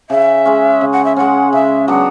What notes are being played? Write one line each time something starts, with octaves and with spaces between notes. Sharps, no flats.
C#3 E5
G#3 C#4
C#3
F#5
E5
G#3 C#4 F#5
C#3 E5
F#3 B3 D4 F#5